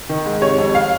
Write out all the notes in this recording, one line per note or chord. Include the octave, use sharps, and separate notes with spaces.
D#3
G#2
C3 C#5
F2
F5